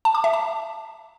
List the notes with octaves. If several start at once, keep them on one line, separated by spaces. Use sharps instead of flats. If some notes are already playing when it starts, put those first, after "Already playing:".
A5
D6
E5
A5